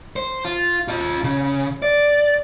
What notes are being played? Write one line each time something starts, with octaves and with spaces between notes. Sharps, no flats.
C5
F4
F4 D#5
C#3
D5